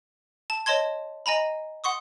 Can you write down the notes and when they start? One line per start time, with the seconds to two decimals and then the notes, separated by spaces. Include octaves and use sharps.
0.50 A5
0.66 C#5 D#5 A5 C6 G#6
1.26 D#5 G#5 A#5 B5
1.84 F#5 C6 C#6 D#6